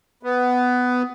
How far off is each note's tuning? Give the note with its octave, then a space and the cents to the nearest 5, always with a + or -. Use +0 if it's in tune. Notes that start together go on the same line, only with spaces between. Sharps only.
B3 +10